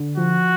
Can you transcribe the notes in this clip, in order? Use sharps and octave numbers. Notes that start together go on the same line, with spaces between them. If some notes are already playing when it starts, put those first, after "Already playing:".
Already playing: D3
F3 F#4